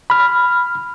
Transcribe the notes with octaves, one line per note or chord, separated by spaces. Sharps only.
B5 F6